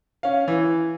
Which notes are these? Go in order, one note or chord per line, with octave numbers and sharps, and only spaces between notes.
C#4 F5
E3